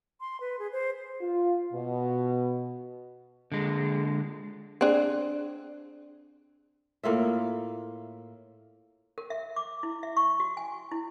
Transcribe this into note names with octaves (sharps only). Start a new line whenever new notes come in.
C6
B4
G#4
C5
F4
B2
D3 G#3
C4 D4 G#4
A2 A#3 F4 E5
A#4
E5
D6
E4
E5
C#6
F#4
G#5
E4